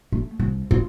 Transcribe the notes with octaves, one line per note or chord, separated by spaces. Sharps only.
A3
C2
F4